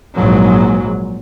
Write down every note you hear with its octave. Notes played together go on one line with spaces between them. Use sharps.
A#1 G#2 F#3